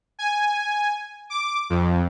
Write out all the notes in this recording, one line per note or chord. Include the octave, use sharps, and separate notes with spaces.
G#5
D6
F2